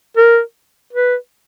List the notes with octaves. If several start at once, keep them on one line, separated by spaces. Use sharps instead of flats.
A#4
B4